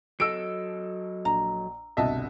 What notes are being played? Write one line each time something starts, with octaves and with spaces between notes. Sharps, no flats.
F#3 A4 D#5 E6 D7
A#1 A#5
G1 C2 B2 D#5 E5 A5